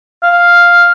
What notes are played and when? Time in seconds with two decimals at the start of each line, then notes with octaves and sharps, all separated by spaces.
0.23 F5